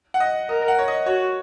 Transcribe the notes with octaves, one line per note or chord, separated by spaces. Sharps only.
F#5
D#5
A#4 D#5
F#5
C#5
D#5
F#4 C#5